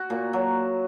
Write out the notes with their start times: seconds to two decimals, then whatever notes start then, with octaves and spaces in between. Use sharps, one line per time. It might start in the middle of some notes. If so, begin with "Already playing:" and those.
Already playing: F#4
0.10 A#2
0.33 F#3